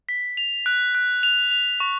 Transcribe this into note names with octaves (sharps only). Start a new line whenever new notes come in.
B6
F7
F#6
F#6
F7
F7
C#6